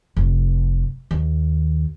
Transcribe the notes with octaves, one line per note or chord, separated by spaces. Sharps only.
F1
D#2